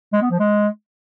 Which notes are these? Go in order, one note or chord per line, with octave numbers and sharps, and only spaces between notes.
G#3
B3
F3
G#3